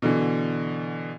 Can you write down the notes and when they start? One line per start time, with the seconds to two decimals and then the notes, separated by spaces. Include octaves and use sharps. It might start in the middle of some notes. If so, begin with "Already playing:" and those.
0.02 B2 D3 E3